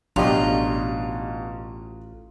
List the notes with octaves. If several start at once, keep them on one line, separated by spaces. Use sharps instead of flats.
A1 B2 F#3 D4 F4 G4 D#5